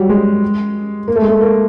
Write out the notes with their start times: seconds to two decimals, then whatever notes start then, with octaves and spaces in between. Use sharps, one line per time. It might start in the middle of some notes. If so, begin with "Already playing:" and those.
Already playing: F#3 G3
0.09 G#3
1.08 A#3
1.16 A3
1.22 G#3
1.29 A3
1.41 A#3